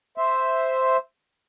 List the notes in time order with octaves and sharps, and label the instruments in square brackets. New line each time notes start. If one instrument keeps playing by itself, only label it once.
[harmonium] C5 E5